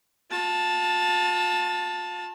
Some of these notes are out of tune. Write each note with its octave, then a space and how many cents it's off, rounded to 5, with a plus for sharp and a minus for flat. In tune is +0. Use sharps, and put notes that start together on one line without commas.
F4 +40 A5 +0